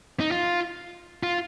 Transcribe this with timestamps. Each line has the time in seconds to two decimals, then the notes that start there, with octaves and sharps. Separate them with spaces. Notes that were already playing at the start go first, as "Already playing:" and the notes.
0.20 D#4
0.31 F4
1.23 F4